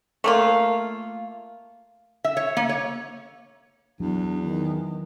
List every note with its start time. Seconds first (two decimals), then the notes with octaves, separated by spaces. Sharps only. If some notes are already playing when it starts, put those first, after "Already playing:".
0.24 A3 A#3 F4
2.24 E5
2.37 C#5
2.57 A#3
2.69 C#5
4.00 E2 F#3 D4
4.44 D#3